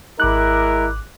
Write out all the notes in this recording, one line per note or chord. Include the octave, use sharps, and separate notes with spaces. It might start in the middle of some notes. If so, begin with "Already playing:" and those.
G#1 G#3 E4 A#4 D6 F#6